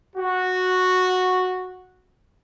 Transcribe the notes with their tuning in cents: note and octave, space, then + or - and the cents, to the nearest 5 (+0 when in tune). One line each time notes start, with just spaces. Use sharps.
F#4 -10